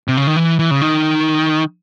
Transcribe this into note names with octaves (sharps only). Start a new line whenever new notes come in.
C3
C#3
D#3
E3
E3
C#3
D#3